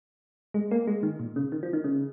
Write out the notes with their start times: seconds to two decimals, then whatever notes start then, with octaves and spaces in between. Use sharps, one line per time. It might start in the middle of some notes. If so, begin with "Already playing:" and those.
0.54 G#3
0.71 A#3
0.87 G#3
1.03 D#3
1.20 A#2
1.36 C#3
1.52 D#3
1.63 F3
1.73 D#3
1.84 C#3